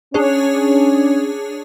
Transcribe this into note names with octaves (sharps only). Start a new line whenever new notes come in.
C#4 D4 G#4 C#5